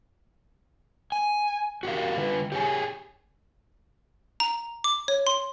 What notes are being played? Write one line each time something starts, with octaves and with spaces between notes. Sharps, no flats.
G#5
F#4 G4 A#4 F5
D3 F4 B4
G4 G#4 C#5 E5 G#5
A#5
D6
C#5
C6